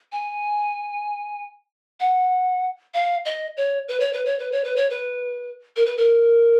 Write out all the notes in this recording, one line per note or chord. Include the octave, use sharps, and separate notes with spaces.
G#5
F#5
F5
D#5
C#5
B4
C#5
B4
C#5
B4
C#5
B4
C#5
B4
A#4
B4
A#4